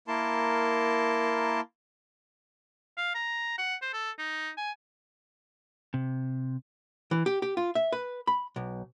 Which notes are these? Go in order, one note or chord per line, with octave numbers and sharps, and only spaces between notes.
A#3 E4 A#4 A5 C6
F5
A#5
F#5
C5
A4
D#4
G#5
C3
E3
G4
G4
F4
E5
B4
B5
B1